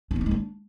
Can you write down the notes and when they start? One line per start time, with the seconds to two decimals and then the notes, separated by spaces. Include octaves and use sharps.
0.11 D4
0.16 C4
0.21 D#4
0.26 G#3
0.31 D4